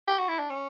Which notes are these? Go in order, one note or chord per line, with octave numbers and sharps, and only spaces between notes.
G4
F#4
E4
D4
C#4